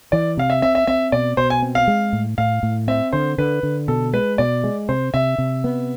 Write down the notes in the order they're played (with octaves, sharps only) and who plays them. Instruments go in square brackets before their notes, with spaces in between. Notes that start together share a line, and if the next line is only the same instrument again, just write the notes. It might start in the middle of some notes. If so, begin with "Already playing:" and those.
[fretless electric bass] E3 [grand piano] D5
[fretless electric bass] C3 [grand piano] F5
[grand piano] E5
[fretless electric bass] C4 [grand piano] E5
[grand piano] E5
[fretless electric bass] C4 [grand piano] E5
[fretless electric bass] B2 [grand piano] D5
[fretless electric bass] B2 [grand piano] C5
[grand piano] G#5
[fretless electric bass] C4
[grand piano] F5
[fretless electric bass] G#3
A2
[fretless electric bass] A2 [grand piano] F5
[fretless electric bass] A2
[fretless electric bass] C4 [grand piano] E5
[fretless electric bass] D3 [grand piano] C5
[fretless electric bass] D3 [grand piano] B4
[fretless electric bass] D3
[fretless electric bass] B2 [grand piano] A4
[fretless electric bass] G#3 [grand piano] B4
[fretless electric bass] B2 [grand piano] D5
[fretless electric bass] G#3
[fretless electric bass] C3 [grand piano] C5
[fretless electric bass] C3 [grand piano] E5
[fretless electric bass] C3
B3